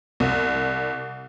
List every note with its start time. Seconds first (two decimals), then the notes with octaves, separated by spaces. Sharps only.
0.20 C2